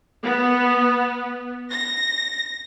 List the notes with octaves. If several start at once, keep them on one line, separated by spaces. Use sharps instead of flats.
B3
A#6